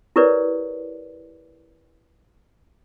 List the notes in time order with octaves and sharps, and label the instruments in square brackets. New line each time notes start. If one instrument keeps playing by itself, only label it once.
[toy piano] E4 G4 A#4 B4 C#5 D5